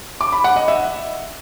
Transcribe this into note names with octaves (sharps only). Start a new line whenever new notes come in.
D6
B5
F#5
D#5
E5